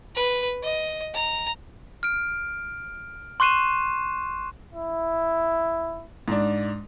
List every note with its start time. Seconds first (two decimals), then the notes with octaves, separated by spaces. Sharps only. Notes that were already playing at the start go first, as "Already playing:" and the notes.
0.16 B4
0.63 D#5
1.14 A#5
2.03 F6 D7
3.40 C6 C#6 F#6 C7 D#7 E7
4.74 E4
6.28 G#2 D4